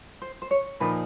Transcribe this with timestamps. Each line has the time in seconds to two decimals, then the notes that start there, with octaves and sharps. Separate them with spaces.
0.22 C5
0.42 C5
0.51 C#5
0.80 A#2 F3 A#3 D#4 B4